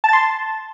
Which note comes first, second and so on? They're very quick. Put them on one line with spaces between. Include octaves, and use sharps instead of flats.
A5 A6 C6